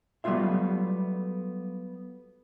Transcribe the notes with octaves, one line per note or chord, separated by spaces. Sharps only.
F#3 G3 A3 B3 F4 E5